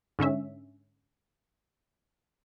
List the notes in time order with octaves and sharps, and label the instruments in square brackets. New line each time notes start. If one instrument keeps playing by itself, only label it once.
[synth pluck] G#2 D3 C#4 E5